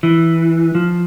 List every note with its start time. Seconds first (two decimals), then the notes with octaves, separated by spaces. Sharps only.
0.03 E3
0.75 F3